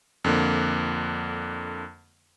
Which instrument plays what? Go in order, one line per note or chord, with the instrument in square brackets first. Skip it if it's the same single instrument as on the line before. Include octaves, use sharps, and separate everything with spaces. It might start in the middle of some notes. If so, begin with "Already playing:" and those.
[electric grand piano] F2 D3 A#3